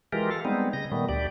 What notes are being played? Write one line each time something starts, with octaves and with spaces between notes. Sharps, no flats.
E3 G#3 F4 G4 A#4
A4 F5
G3 G#3 B3 C4 D#4
C#3 D#5 A#6
A#2 D#3 G3 A3 B3
D2 G4 D5